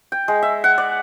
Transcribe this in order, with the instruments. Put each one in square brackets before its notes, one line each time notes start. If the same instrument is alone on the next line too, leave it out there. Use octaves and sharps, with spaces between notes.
[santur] G5
G#3
E5
F#5
D5